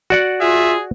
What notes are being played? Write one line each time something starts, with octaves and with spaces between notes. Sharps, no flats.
F#4 D5 F#5
F4 G#4 E5